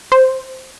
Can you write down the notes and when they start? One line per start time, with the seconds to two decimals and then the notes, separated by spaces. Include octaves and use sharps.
0.12 C5